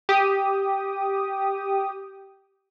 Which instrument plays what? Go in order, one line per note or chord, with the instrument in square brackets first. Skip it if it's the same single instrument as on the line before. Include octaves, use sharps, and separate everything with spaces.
[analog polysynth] G4 D#6